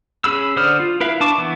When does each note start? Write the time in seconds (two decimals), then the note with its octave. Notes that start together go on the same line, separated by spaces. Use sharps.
0.24 C#4 G#4 B5 E6
0.56 D3 C5 D5 D#6 F6
0.80 F4
1.00 E4 A#4 B4 E5 F5
1.21 D4 A5 C#6 D6
1.38 E3 B3